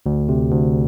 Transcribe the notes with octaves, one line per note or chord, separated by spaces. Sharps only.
D2
C3
D2